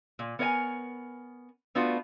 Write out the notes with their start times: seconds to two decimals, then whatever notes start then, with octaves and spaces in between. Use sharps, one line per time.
0.19 A#2
0.39 B3 A#4 C#5 D5 G#5
1.75 A3 B3 D4 F4 F#4